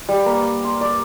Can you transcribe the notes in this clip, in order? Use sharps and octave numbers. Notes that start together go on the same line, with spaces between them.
G3
A#3
C6
D5